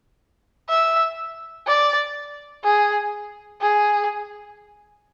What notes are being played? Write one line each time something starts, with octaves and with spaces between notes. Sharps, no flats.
E5
D5
G#4
G#4